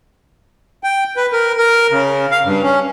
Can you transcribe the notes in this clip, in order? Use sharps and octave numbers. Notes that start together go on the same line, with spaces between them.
G5
B4
A#4
A#4
C#3
F5
G2
C#4